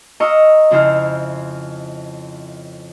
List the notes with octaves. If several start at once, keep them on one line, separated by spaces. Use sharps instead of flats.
D#5 F5 A#5 C#6 E6
F2 C#3 E4 C5 F6